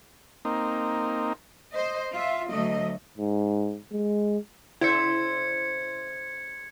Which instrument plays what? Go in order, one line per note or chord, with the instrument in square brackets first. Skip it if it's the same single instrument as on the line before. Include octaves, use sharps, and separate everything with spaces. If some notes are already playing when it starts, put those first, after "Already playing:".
[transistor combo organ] A#3 C4 D#4
[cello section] C5 D#5
F4 E5
D2 F#3 A3 D#5
[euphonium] G#2
G#3
[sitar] C#3 C5 E5 [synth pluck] E4 [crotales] G#6 C#7